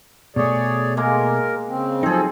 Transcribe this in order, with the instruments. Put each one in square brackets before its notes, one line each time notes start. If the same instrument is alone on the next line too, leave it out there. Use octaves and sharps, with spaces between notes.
[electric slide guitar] B2 A3 [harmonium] G#4 C#5 D5
[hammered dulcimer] G#3 A#3 [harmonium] A#4
[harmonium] C#3 C4
[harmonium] F3 A4 [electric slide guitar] F#3 D#4 [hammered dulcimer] C4 G#4